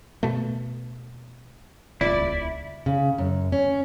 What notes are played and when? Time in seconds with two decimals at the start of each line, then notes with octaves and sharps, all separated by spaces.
0.23 B2 A3
2.01 D#1 G#1 C#2 E4 D5
2.86 C#3
3.18 F#2
3.52 C#4